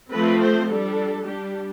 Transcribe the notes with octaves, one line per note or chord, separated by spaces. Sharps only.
F3 A3 C4 B4
C5
G3 D4 A4
G3 D4 G4